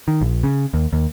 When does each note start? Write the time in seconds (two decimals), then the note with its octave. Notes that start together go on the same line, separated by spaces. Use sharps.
0.08 D#3
0.21 A#1
0.43 C#3
0.74 D#2
0.93 D#2